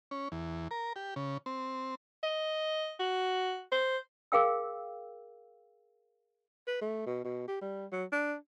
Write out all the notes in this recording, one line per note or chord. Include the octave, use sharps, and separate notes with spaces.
C#4
E2
A#4
G4
C#3
C4
D#5
F#4
C5
G#4 A#4 F5 G5 E6
B4
A3
B2
B2
G4
G3
F#3
D4